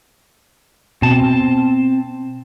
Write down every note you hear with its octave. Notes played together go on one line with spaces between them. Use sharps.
B2 C4 A5